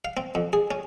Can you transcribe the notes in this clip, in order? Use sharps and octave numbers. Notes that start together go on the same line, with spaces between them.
F5
C4
F2
G#4
C#4